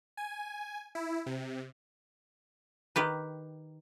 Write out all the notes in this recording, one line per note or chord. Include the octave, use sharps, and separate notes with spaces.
G#5
E4
C3
D#3 G4 B4